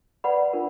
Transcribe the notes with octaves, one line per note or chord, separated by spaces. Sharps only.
B4 D5 F#5 B5
D4 F4 A#4